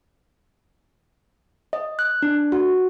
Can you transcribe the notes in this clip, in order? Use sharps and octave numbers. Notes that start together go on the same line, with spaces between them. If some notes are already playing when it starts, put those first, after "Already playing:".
D#5
F#6
D4
F#4